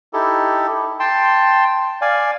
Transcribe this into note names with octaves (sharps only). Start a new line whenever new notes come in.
D#4 E4 G4 A4
G5 A5 C6
D5 F5 G#5